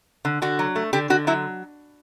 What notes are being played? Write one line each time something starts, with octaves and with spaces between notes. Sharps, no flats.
D3
D3 F#4
F#3
A3
D3 G4
D3 F#4
F#3 E4